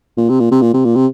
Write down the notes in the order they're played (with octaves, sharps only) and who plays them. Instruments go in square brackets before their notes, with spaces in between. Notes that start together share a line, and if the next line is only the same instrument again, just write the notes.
[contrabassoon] A#2
C3
A#2
C3
A#2
C3
A#2
C3